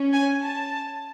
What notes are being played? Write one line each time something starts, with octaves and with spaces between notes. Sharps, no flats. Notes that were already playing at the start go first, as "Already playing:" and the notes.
Already playing: C#4
G#5
A5